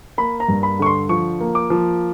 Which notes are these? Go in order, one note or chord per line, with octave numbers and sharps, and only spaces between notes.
A#3 B5
A#5
G2
B5
D3 C#6
C6
F3 C#6
A#3
D6
F3